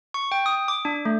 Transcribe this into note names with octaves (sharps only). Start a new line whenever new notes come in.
C#6
G5
D#6
D6
D4
A3